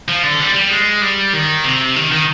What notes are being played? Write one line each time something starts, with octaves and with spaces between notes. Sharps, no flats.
F3
D3
G3
G3
G#3
G3
D#3
C3
D#3
D#3